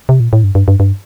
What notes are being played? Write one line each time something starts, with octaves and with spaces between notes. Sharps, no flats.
C3
A#2
A2
G2
G2
G2
G2